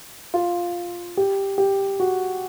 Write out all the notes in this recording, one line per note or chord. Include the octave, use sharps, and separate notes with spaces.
F4
G4
G4
F#4